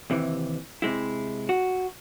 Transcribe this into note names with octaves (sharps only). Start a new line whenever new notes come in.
D#2 C3 E3
C3 G#3 E4
F#4